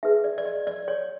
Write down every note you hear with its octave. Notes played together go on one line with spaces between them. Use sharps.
D#4 G#4 B4 E5
D5
D5
D#5
D5
C#5